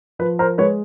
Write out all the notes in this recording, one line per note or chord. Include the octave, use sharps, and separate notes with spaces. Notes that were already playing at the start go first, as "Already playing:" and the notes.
F3 B4
A#4 C5
G#3 B4 C#5